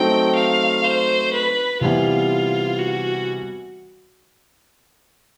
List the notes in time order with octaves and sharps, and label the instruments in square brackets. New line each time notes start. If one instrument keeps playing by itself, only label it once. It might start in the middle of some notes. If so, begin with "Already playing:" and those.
Already playing: [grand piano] F#3 A3 C4 D#4 [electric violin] G5
[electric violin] F5
C5
B4
[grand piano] C3 E3 G3 B3 E4 [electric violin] F4
[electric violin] F#4